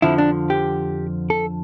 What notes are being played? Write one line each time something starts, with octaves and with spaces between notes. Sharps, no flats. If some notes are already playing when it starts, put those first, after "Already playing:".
F2 D3 F3 E4
D4
G4
A4